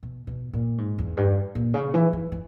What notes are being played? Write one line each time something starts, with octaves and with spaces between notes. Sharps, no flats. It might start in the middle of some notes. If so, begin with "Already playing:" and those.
B2
B2
A#2
G#2
E2
G2
A#2
C#3
E3
E3
E3